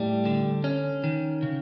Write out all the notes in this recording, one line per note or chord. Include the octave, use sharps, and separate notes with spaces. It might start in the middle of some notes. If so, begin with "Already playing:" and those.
Already playing: A2 G3
D3
C#4
D#3
C#3